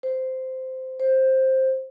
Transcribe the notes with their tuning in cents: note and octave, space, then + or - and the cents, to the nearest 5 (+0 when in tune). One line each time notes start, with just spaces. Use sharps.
C5 -10
C5 +10